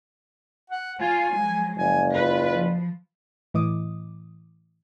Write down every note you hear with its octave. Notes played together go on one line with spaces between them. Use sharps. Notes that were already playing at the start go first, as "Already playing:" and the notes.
F#5
F4 C#5 G#5
F3 F#3 G#3
F#1 G#5
F4 B4
F3
A2 E3 D#5 D6 D#6